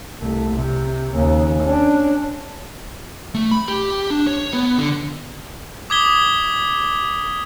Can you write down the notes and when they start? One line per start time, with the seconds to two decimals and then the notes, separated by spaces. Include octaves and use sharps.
0.20 C2 A3
0.54 C3
1.14 D#2 C#3
1.63 C#4 D4
3.34 A3
3.51 B5
3.68 G4
4.10 D4
4.27 C#5
4.53 B3
4.78 D3
5.90 D6 D#6 G#6 B6 G7